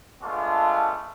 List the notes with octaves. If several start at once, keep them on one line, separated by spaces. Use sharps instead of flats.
G#3 A3 B3 D4 F4 C#6